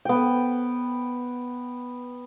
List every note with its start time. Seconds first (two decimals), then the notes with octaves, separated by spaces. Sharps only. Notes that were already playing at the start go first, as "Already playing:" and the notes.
0.05 B3 G5